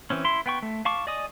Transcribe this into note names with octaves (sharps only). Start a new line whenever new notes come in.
E3 C4 C#4
E4 C6
B3 G5 C#6
A3
F5 A5 C#6 D6
D5 D#5 G#5 D#6